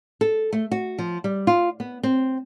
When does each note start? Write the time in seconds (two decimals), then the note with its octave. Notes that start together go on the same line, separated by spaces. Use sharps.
0.21 A4
0.53 A3
0.71 F#4
0.98 F3
1.24 G3
1.47 F4
1.80 B3
2.03 C4